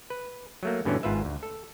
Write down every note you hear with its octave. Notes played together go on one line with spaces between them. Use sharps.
B4
F#3 A3 A#3
G2 B2 D3 E3 C#4
G#1 G#2 F4 B4 E5
D2
A4